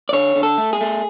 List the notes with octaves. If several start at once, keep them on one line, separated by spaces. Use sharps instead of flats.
D5
D3 C#5
D3
A4
A3
G#4
A3